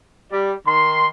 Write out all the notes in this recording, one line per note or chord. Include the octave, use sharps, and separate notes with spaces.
G3 D5
D#3 C6